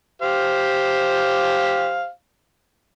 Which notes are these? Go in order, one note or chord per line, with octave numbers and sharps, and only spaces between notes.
G4 C5 F5